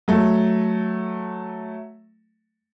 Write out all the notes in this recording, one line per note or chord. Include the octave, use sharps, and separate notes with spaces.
F#3 A3